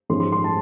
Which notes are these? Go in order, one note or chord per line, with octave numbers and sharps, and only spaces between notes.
G#2 F3 G#3 C#4 C6
C6
C6
A5